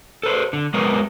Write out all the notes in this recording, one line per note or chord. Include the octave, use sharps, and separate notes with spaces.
A4 B4 C5
D3
G#3 B3 A#4 B4 C#5